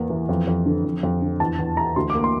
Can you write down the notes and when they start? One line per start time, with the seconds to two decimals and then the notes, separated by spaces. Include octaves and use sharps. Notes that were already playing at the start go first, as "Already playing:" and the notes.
Already playing: E2 A#3
0.10 E3
0.29 F2
0.47 F2
0.66 D3
0.85 F2
1.03 F2
1.22 D3
1.40 E2 A5
1.58 E2
1.77 E3 A#5
1.96 D2 C6
2.10 A#3 D6
2.24 C6